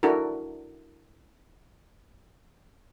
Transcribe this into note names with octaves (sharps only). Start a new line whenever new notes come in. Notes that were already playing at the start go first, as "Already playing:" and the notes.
D4 E4 F#4 A4 A#4